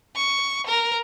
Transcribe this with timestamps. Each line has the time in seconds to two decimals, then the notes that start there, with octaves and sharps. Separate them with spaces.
0.16 C#6
0.67 A#4